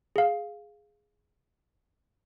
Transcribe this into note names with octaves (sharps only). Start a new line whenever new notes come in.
G#4 F5